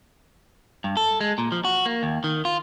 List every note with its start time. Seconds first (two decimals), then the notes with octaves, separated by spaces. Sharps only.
0.84 G2
0.97 A4
1.21 G#3
1.38 A#2
1.52 F3
1.65 F#4
1.86 A#3
2.03 D#2
2.24 D#3
2.45 F4